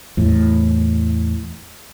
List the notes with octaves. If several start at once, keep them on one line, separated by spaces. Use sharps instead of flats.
E2 A2